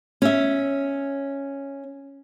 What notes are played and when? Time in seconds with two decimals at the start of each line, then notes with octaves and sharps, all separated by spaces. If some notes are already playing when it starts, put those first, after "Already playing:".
0.22 C#4 E5